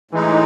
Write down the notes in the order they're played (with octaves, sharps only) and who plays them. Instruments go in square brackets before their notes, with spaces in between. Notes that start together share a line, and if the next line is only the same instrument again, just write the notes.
[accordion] A2 G#3 D#4 [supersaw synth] E3